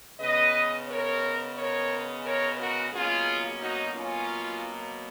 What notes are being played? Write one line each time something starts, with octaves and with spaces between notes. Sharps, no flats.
C#3 G#3 B3 B4 D#5
A#4 C#5
A#4 C#5
A#4 C#5
F#4 A#4
B2 F#3 A#3 C#4 F4 G#4
D#4 F#4
C#4 F4